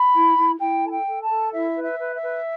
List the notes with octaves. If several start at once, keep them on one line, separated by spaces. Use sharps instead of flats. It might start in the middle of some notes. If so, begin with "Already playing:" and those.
Already playing: B5
E4
E4
E4 G5
A4 A5
G5
A4
A5
A4
E4 E5
B4
E5
B4
E5
B4